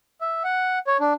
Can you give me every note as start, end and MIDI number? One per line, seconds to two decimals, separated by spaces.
0.21 0.43 76
0.44 0.79 78
0.87 0.97 73
1.00 1.13 62